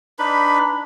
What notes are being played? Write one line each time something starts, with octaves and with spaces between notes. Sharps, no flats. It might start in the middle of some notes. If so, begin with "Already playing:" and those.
D4 D#4 B4 B5